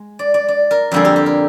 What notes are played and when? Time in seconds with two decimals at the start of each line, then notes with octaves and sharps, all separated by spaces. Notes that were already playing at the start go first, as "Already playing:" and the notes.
Already playing: G#3
0.19 D5
0.34 D5
0.48 D5
0.71 A#4
0.92 F2 D3 G3 A#3 G#4
1.05 G4
1.16 G4
1.26 A#4